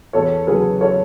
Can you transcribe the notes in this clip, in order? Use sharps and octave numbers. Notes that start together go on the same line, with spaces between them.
E2 A4 C#5
C#3 F#3 G#4 B4
A4 C#5